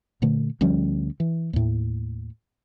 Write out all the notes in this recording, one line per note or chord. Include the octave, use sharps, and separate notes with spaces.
A#2 D3 A3
D2 F3 G3 C#4
E3
D#2 A2